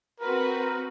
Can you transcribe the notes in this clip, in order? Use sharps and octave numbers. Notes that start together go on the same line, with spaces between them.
C4 F#4 A#4 B4